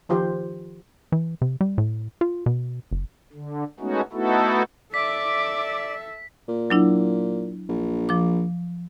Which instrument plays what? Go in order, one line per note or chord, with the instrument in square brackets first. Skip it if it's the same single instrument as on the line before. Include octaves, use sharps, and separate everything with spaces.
[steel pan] D#3 F3 F4 G4 C5
[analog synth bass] E3
C3
G3
A2
F4
B2
F#1
[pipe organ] D3
G#3 A3 B3 C#4 D#4 F#4
A3 B3 D#4 E4 F#4 A4
[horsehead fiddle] A4 E5 [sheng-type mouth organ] D5 [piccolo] D6 [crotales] B6
[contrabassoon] A#2
[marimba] F#3 D4 E4
[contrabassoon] A#1
[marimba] F3 D6